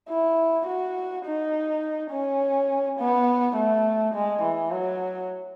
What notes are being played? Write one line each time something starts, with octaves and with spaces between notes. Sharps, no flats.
E4
F#4
D#4
C#4
B3
A3
G#3
E3
F#3